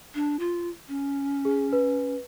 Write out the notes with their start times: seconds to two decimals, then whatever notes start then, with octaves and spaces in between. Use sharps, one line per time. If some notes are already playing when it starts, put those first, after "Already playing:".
0.15 D4
0.39 F4
0.88 C#4
1.45 G#4
1.73 B4